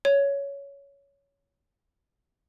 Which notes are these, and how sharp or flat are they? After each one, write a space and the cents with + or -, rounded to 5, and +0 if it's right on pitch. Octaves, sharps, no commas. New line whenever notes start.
C#5 +10